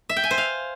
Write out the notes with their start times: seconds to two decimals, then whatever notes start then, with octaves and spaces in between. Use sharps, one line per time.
0.09 E5
0.17 G5
0.24 G#5
0.31 C5
0.38 F5